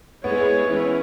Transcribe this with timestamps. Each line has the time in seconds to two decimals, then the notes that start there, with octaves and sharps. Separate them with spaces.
0.24 G#3 B3 E4 G#4 C#5
0.68 E3 C#4 E4